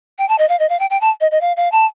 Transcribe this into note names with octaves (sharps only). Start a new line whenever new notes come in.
G5
A5
D#5
F5
D#5
F5
G5
G5
A5
D#5
D#5
F5
F5
A5